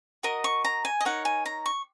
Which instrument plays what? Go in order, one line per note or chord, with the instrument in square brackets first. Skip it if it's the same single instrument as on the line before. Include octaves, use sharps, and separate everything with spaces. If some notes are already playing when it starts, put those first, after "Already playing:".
[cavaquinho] F#4 A#4 D#5 D#6
C#6
A#5
G#5
D#5
D#4 A#4 C#5 F#5
G#5
A#5
C#6